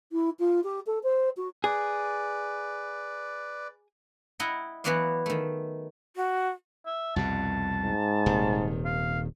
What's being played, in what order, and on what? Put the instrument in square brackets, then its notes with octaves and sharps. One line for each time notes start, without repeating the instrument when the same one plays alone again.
[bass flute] E4
F4
G4
A4
C5
F#4
[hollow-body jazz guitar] G#4 [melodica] B4 D5
[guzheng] E4 D#5 F#5 G5 A#5
E3 F#3 B3 F#4 D5 F5
D#3 A3
[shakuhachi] F#4
[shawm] E5
[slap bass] C2 F2 B2 [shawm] A5
[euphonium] G#2
[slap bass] D#1 C3 D#3
[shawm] F5